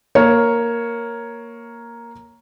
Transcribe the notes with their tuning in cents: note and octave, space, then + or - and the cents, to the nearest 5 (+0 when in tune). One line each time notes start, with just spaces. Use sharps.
A#3 +0 C#5 +0